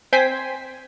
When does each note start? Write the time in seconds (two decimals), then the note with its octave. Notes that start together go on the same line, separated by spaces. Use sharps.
0.13 C4 C5 G5 G#5 B6